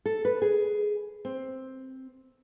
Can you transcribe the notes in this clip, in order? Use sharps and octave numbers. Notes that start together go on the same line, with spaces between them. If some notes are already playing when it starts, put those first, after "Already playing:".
A4
B4
G#4
C4